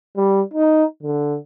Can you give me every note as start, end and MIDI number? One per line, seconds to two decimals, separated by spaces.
0.17 0.41 55
0.54 0.84 63
1.03 1.38 50